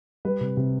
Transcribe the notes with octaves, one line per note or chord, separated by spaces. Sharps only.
G3 B4
C3
C3